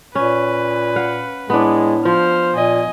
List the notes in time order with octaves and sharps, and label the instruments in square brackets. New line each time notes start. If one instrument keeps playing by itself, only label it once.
[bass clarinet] A#2 [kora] C#4 [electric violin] B4
[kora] F5 F#5
[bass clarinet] A2 [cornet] G#3 [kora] B3 D4
[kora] F3 [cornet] C5 [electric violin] F6
[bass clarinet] A#2 [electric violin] D#5 G#5